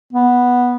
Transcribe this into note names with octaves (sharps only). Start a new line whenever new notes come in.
B3